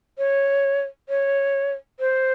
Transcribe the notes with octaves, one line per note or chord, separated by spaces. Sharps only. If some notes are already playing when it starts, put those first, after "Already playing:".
C#5
C#5
C5